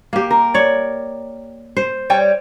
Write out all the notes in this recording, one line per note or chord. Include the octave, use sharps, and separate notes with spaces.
A#3 G4
A#4
C#5 D5
C5
G3 C#5 G5